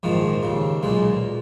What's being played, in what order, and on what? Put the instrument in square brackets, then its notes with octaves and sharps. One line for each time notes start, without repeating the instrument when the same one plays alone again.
[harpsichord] A#1 G#2 D#3 F3
D#2 C#3
B1 A#2 G#3